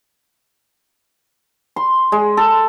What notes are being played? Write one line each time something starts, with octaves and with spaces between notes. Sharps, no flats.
C6
G#3
A4